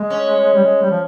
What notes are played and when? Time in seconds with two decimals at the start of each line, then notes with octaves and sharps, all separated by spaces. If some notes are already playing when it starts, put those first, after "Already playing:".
Already playing: G#3
0.10 C#4
0.55 G3
0.64 G#3
0.82 G3
0.91 F3